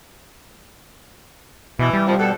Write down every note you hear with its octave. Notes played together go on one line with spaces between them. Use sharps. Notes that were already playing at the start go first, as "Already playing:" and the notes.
B2 E3
G3
C3 D#3 F3
B2 G4 A4